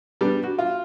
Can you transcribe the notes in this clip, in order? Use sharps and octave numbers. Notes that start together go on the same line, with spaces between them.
G3 B3 D4
F#4
F4